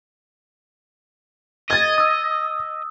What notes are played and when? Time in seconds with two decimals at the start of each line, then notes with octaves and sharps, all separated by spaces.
1.71 D#5 G#6 A6
1.98 D#6 E6